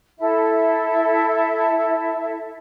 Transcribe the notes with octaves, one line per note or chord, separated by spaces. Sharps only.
E4 A4 E5